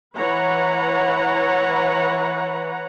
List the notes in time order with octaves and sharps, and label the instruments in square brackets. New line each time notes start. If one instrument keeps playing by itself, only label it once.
[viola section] E3 B4 C#5 F#5 A#5